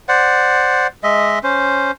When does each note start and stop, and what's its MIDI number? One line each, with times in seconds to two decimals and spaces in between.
0.09 0.87 72
0.09 0.87 74
0.09 0.87 78
1.03 1.39 56
1.03 1.39 75
1.03 1.39 76
1.43 1.91 61
1.43 1.91 72